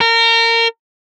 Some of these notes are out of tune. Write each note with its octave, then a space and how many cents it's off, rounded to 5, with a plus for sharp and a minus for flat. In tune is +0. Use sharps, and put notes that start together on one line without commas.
A#4 -25